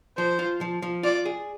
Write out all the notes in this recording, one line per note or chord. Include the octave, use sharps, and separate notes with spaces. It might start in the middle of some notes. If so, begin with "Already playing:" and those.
F3 C5
F4
F3
F3
F4 D5
G#4